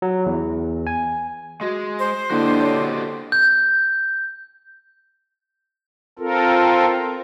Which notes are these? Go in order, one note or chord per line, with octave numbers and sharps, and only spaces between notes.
F#3
E2
G#5
G#3 F#4 D#5
C5
D3 A#3 D4 E4 F#4 G4 D#5
C#5
G6
C4 F4 A4 A#4